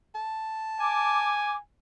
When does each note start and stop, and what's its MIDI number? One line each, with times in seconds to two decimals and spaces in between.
0.15 1.43 81
0.80 1.59 80
0.80 1.55 86